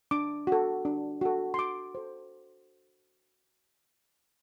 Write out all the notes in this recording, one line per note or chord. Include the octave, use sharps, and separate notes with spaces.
D4 D6
F#4 A4
D4
F#4 A4
C6
F#4 D6
A4 C5